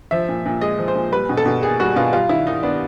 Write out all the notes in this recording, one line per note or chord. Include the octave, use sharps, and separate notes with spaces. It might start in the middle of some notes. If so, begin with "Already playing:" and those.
F3 E5
A#2
A#2
G#3 D#5
F3
C5
A#2
G3 B4
B2
A4
B2
A#3 G#4
G3 F#4
B2 F4
G3 F4
D#3 E4
D#3 D#4
B3 D4